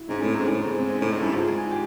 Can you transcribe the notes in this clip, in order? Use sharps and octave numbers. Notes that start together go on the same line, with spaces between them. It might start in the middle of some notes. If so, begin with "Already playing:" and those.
Already playing: E4 F#4
G#2 C#4
A2 C4
G#2 D4
A2
C4
G#2 B3
C4
C#4
A2 D4
G#2 E4
G2
G#2 F4
G#4
G4